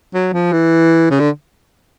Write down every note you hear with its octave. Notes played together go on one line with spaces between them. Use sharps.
F#3
F3
E3
C#3
D3